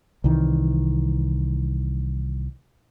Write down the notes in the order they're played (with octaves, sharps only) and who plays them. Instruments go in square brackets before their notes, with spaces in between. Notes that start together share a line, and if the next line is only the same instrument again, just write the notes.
[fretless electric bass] C2 D#3 E3